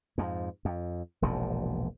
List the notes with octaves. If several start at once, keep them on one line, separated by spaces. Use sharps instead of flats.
F2 G#2
F2
E1 A#1 G#2 B2